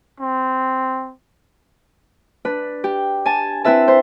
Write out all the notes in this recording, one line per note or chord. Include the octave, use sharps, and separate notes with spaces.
C4
D4 B4
G4
G#5 A5
C4 E4 B4 E5 A5
C5